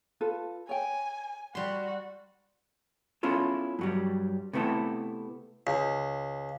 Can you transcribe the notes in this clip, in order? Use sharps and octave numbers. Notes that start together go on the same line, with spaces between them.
F4 A4 B4
C#5 G5 G#5
G3 F#4 C6
B3 C#4 E4 F4 A4
G2 F#3 G3
C3 A3 B3 E4 A4
C#2